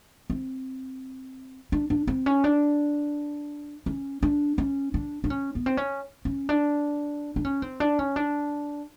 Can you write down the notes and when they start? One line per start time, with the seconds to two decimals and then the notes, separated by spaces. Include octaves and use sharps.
0.30 C4
1.72 D4
1.90 D4
2.07 C4
2.26 C#4
2.44 D4
3.86 C#4
4.23 D4
4.58 C#4
4.94 D4
5.24 D4
5.30 C#4
5.55 B3
5.66 C4
5.77 C#4
6.25 C#4
6.49 D4
7.36 D4
7.45 C#4
7.62 C4
7.80 D4
7.99 C#4
8.16 D4